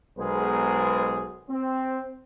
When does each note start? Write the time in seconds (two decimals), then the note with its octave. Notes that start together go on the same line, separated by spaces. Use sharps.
0.19 B1 G#3 B3 G#4 A#4 C5
1.50 C4